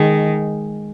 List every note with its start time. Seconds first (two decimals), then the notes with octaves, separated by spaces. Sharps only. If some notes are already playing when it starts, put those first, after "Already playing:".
Already playing: D#3 G#3